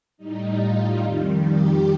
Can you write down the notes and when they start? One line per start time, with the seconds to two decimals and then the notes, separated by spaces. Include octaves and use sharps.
0.18 A2 G3 D#4
0.59 F4
1.00 F2 D#3 G3
1.42 G4